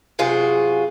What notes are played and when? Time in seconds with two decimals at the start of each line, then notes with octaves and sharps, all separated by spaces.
0.19 F#2 C3 F4 F#4 G#4